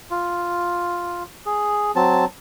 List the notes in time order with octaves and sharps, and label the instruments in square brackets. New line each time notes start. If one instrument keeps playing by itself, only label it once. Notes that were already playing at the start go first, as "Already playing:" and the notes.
[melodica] F4
G#4
F#3 C4 A5